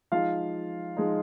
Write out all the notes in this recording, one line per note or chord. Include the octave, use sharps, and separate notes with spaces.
F3 G#3 D#4 F4 F5
F3 G#3 D#4